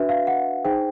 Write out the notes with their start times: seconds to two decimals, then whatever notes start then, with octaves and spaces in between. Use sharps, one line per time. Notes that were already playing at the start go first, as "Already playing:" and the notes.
Already playing: D4 F#4 B4 E5
0.09 F5
0.27 F#5
0.64 D#4 G#4 C5 G5